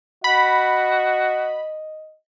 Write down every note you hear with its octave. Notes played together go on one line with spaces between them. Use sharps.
F#4 D#5 B5